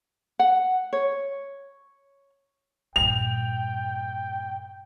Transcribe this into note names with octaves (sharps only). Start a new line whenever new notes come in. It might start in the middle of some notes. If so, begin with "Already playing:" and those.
F#5
C#5
G2 A#2 G5 F7